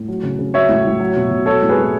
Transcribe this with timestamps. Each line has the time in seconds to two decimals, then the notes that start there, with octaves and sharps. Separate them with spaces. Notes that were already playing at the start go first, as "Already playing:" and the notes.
Already playing: A2
0.08 F#3
0.23 C#3
0.39 C#3
0.54 F#3 C#5 E5
0.69 A2
0.85 A2
1.00 F#3
1.16 B2
1.31 B2
1.46 F#3 A4 C#5
1.62 A2
1.69 G#4 B4
1.77 A2